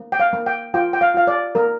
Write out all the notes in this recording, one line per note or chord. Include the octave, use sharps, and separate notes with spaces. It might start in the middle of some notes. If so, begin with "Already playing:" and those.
Already playing: A#3
G5
F5
A#3
G5
F4 G5
G5
F5
F4 F5
D5
A#3 A#4